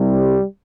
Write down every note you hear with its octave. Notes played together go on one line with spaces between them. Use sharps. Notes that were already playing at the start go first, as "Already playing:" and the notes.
Already playing: C2 C3 G3